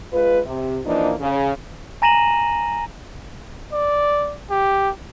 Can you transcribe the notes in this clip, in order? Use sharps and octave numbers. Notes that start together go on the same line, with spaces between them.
G#3 F4 B4
C3
E3 F3 A#3 D4 D#4
C#3
G#5 A#5 A#6 D#7 E7 F#7
D5
G4